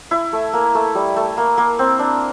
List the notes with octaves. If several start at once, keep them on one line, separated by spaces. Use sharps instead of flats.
E4
A3
A#3
A3
G3
A3
A#3
A#3
C4
D4